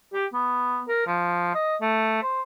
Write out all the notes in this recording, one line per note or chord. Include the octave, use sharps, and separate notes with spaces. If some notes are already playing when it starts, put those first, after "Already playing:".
G4
B3
A#4
F3
D#5
A3
C5